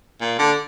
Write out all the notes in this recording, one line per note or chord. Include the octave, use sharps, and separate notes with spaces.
A#2
D3